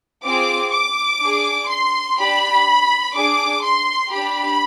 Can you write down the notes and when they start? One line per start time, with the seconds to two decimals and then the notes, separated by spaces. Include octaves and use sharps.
0.24 C4 F4 G#4 D6
0.72 D6
1.21 D4 G#4
1.69 C6
2.18 D4 G4 B5
3.16 D4 G#4 D6
3.64 C6
4.12 D4 G4 B5